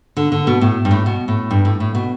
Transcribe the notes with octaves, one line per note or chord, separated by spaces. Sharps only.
D3
D3
B2
A2
G2
A2
B2
A2
G2
A2
A2
B2